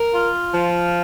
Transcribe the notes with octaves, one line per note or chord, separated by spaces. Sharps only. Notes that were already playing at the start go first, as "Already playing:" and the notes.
Already playing: A#4
F4
F3